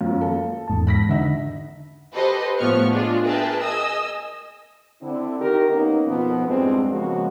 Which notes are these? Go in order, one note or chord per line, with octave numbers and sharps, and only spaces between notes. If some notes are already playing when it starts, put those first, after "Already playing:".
F#2 F3 F5
A#3 A4
E2 G#2 A5
B5 A#6 B6
D3 D#4 E5 F#5
G4 A4 B4 C5 D#5
A2 F3 B3 C#6 F6 C#7
D4 F4 G#4 D#5
G#4 A#4 B4 E5 G5 A5
D#5 G#5 D#6 E6
D3 C4 E4
D#3 D#4 G4 A#4
A#3 B3 C#4 D#4
F2 B2 F3 B3
E2 G2 G#3 C4
C#3 F3 G#3 A#3 B3 F#4